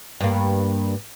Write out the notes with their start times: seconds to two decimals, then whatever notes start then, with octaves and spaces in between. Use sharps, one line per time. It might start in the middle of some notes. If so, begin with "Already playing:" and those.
0.21 G2 A#3